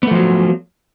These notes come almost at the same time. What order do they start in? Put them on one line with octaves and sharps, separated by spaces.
B3 A3 F3 F#3